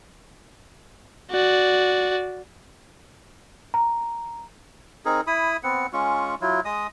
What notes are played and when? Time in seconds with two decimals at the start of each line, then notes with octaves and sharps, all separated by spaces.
1.31 F#4 D5
3.74 A#5
5.05 C4 D#4 G#4 A#4
5.27 E4 B5 D#6
5.63 B3 C4 F#5
5.93 G#3 C#4 F4 C#6
6.41 F#3 E4 F4
6.65 G#3 D#5 D#6